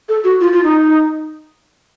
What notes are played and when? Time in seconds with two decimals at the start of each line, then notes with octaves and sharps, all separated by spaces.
0.09 A4
0.24 F#4
0.41 F4
0.53 F4
0.64 D#4